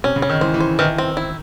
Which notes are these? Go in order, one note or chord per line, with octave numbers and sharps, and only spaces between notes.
C3 C#4
C#3
C#4
D#3
E3 C5
E3
C5
D#3 E3
C4
E4